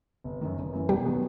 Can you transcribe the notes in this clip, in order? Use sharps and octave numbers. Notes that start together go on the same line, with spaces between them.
G1
F#2 D#3
G1
F#2 E3
E1 G3 G4
D#3 F#3 B3